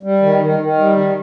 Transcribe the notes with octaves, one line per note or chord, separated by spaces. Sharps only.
G3
D#3
D#3
D#3
G3
D#3